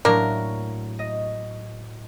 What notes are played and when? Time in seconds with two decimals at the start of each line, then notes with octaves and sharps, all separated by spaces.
0.05 A2 F#3 A#3 D4 A#4
0.99 D#5